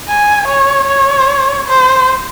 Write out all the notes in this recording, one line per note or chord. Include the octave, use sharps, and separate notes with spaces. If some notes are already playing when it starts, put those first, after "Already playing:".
G#5
C#5
C#5
C5